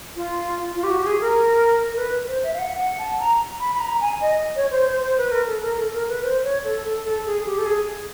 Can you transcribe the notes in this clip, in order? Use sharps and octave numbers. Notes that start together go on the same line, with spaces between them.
F4
F4
G4
F#4
G4
G#4
A#4
A#4
B4
C5
E5
F5
F#5
F#5
A5
A#5
B5
B5
A#5
G#5
D#5
C#5
C5
C5
C5
B4
A#4
A4
A#4
A4
A#4
B4
C5
C#5
A4
A4
A4
G#4
G4
A4
G#4